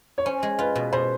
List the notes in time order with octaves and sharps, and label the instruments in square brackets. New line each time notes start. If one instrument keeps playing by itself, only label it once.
[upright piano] C#5
[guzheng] C#4 [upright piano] C5
[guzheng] G#3
[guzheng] F4 [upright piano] B4
[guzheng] B2
[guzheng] B2 [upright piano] C5